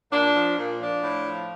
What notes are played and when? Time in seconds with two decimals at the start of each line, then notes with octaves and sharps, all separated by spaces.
0.12 A#2 D4
0.35 F3
0.58 A#2
0.80 F3 D4
1.03 A2
1.26 F3